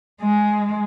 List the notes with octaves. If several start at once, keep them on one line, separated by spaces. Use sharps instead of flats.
G#3